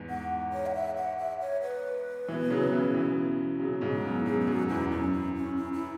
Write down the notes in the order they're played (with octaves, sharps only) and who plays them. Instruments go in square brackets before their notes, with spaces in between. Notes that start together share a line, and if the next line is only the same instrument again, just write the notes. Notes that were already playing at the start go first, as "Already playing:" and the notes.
Already playing: [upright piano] E2 G#2
[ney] F#5
C#5
F#5
E5
F#5
E5
C#5
B4
[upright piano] B2 E3
C#3 F#3
B2 E3
B2 E3
C#3 F#3
G#2 C#3
[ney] E4
[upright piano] F#2 B2
[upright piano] F#2 B2 [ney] G#4
[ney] G#4
[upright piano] F#2 [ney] F#4
[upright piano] E2 [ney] E4
[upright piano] F#2 [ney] C#4
[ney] E4
C#4
E4
E4